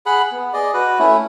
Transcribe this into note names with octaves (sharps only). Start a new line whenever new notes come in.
G#4 F#5 B5
B3
G#4 D5 D#5
F#4 B4
A3 C#4 E4